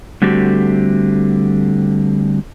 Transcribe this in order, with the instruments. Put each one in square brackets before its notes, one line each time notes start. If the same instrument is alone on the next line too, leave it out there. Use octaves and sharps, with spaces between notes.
[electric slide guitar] D3 G3 A3 C4 F#4 G4